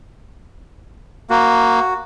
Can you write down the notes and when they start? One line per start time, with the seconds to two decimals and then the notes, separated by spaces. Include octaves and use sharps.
1.30 A#3 F#4